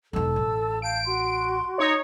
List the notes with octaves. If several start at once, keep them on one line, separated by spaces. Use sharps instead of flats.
E1 D#4 A4 A5 E6
A1
F5 A5 G6 D7
F#4 C6
D#4 C#5